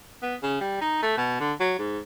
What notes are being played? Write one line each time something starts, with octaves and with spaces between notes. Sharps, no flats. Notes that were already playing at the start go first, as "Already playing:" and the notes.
B3
C#3
G3
D#4
A3
B2
D3
F#3
G#2